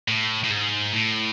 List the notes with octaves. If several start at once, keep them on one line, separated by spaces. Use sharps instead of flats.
A2
A2
G#2
A2